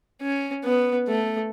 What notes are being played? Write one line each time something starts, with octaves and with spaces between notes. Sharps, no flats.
C#4
B3
A3